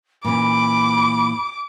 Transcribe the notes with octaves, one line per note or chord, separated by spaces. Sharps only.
A#2 E3 C#4 B5 D6